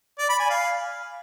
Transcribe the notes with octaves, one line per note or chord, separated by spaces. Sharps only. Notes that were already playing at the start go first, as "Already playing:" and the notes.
D5
B5
G#5
F5